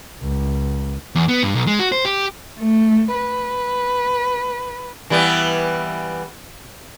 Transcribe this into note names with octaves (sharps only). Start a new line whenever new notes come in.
C#2
E2
B3
G2
B1
G#3
F#4
C5
G4
A3
B4
E3 G3 B3